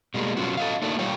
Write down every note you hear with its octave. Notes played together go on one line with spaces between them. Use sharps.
B2 G3 G#3 A#3
B2 F#3 C#4 F4 F#4
A4 D#5 F5
A3 A#3 D4 D#4
G3 F4 C#5 G5